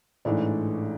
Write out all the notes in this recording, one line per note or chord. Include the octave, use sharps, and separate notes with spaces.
A1 G#2 E3 A3 D4 D5